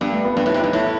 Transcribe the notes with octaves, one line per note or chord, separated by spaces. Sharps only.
G2 B3
A3
B3
G2 B3
A2
D#4
C3
G2 E4
A2 E4